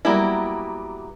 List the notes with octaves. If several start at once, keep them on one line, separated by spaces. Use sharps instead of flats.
F#3 G3 A#3 B3 E4